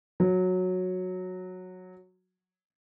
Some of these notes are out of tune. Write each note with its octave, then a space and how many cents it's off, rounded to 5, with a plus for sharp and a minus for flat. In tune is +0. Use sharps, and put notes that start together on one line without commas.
F#3 -10